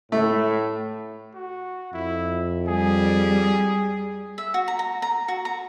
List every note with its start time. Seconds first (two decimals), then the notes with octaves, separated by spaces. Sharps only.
0.12 A2 A3
1.34 F#4
1.93 F2 E4
2.68 G3 G#4
4.38 E5
4.54 F#4
4.68 A#5
4.79 A#5
5.02 A#5
5.28 F#4
5.45 A#5